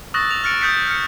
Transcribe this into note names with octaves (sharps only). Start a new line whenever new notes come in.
C#6 D#6 E6 F#6 A6 A#6
F7
F6 A6 C#7 D7
D#6 F#6 G6 A6 B6 C#7
F6 C#7